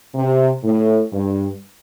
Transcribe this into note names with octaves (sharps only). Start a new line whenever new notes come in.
C3
A2
G2